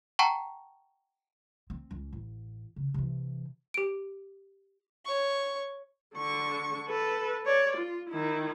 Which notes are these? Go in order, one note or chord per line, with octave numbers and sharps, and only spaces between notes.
F#5 G5 A5 A#5 C#6
C4
C#2 C#4
A1
C#3
C3 E3
G4 D7
C#5 C#6
D3 C#6
A4 B4
C#5 D5
F4
D#3 E4